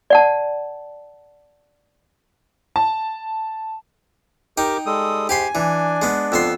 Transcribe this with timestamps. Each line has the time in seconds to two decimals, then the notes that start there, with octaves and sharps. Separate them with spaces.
0.10 D5 F#5 A5
2.76 A5
4.57 D#4 G4 A#4 G5 D6
4.86 G3 G#3 A4 D#6
5.29 G#2 G4 G#5 B5 C6
5.55 E3 D4
6.02 G#3 B3
6.32 F2 B3 C6 E6